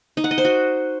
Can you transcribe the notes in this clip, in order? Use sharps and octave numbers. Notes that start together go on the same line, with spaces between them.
D#4
F#5
D#5
C5
F#4